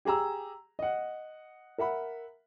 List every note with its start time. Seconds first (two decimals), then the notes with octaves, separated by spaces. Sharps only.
0.05 G4 G#4 A#5 E6
0.79 D#5 F#5
1.78 A#4 E5 F#5 B5